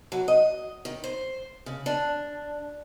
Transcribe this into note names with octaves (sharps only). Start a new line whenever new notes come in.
F#3
D#5
D#3
C5
C#3
D4